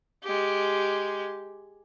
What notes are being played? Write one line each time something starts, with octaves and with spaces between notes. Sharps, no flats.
G#3 G4